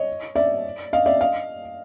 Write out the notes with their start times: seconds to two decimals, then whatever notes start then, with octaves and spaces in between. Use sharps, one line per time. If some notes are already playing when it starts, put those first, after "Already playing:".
Already playing: C#5 D#5
0.36 D5 E5
0.93 D#5 F5
1.06 D5 E5
1.21 D#5 F5